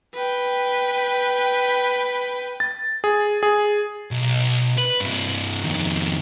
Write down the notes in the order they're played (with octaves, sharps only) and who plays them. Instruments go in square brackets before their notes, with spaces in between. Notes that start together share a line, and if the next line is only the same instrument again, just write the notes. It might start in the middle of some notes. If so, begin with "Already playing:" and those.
[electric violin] B4 G5
[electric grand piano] A6
G#4
G#4
[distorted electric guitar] B1
B4
G2 C3
F2 D#3